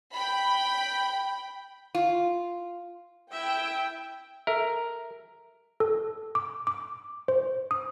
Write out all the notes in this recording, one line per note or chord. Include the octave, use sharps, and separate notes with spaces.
G5 B5
F4
E4 E5 G5
A4 A#4 E5
A4
D6
D6
C5
D#6